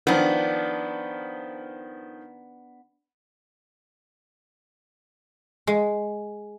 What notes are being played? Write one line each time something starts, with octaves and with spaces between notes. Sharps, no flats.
D#3 F3 B3 D4
G#3